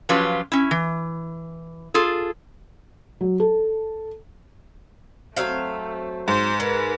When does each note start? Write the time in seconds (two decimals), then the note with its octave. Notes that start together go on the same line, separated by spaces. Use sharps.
0.09 F3 F#3 C#4 F4 G4 B4
0.52 C#4 E4
0.71 E3
1.94 F4 G#4 A4
3.21 F#3
3.40 A4
5.37 F#3 A3 C4 F5
6.28 G#2 C5
6.60 G#3 A#4 B4